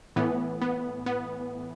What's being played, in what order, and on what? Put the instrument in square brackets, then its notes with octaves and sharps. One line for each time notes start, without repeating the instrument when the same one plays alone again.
[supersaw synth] A2 E3 B3
B3
B3